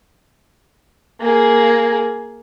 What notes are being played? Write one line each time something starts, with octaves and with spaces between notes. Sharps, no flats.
A#3 G#4